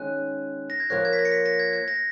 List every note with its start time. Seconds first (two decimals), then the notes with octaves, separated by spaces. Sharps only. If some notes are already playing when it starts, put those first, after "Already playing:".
Already playing: D#3 G#3 C#4 F#6
0.70 A#6
0.80 G#6
0.90 F3 A#3 F4 A#4 C#5 F#6
1.05 G#6
1.13 B6
1.19 A#6
1.25 C#7
1.32 B6
1.46 A#6
1.59 G#6
1.73 G#6
1.88 A#6